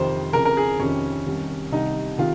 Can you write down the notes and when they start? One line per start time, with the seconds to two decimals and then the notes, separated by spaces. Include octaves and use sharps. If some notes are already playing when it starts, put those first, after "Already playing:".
Already playing: F2 C3 D#3 C5
0.33 F2 C#3 A#4
0.45 A#4
0.57 G#4
0.79 F2 C3 D#3 C#4
1.26 C2 C3 D#3
1.72 C2 C3 D#3 D#4
2.18 C3 D#3 F4